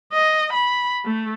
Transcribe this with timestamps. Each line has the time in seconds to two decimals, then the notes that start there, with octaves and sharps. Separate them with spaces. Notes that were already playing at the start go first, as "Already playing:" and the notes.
0.13 D#5
0.53 B5
1.05 A3